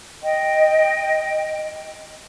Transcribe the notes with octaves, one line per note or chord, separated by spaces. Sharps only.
D#5 G5